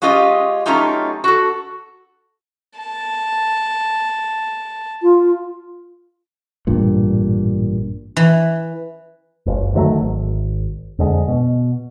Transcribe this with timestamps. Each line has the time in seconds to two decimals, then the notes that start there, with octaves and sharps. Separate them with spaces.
0.02 G#3 C#4 F4 G4 D#5
0.66 F#3 A3 C#4 D#4 F4 G4
1.24 F#4 A4
2.78 A5
5.03 F4
6.67 A1 G2 A#2
8.16 E3
9.46 F#1 C#2
9.74 D3 D#3 F#3 A3
10.01 G#1
10.99 F2 D3 G#3
11.28 B2